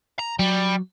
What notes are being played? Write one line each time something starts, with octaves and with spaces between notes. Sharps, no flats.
A#5
F#3 G3